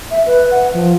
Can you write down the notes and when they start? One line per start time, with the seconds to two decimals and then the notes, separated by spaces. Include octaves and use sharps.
0.11 E5
0.26 B4
0.51 F#5
0.73 F3